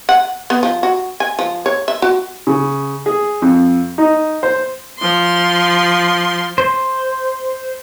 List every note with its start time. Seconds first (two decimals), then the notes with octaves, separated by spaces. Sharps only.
0.09 F#5
0.50 B3
0.63 F3
0.83 F#4
1.20 G#5
1.39 F3
1.66 C#5
1.88 E5
2.02 F#4
2.47 C#3
3.06 G#4
3.42 F2
3.98 D#4
4.43 C5
4.99 F3 C6
6.58 C5